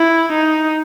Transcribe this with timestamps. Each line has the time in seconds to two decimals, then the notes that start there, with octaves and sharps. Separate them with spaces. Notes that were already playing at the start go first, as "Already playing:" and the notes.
Already playing: E4
0.33 D#4